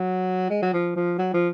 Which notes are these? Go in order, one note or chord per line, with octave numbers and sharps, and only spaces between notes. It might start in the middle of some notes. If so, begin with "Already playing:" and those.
Already playing: F#3
G#3
F#3
F3
F3
F#3
F3